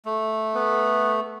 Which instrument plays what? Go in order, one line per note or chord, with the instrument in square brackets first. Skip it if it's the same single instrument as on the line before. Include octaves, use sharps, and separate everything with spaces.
[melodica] A3
[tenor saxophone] B3